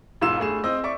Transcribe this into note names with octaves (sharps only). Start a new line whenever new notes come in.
E1 G#2 F4 C6 E6 E7
G2 A3 G#4 E7
C4 D#5 E6
D5 E5 C#6 D6